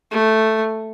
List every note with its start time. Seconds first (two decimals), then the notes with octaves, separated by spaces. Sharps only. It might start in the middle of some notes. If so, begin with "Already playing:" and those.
0.11 A3